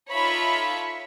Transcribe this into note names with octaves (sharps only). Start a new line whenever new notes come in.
D#4 F4 A4 C#5 E5 B5